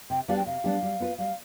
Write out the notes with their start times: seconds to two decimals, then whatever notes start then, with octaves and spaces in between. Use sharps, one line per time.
0.10 C3 G5
0.28 G3 B3 D4 G4 F5
0.37 G5
0.46 C3 F5
0.64 G3 B3 D4 G4
0.82 G3
1.00 B3 F4 B4
1.18 G3 F5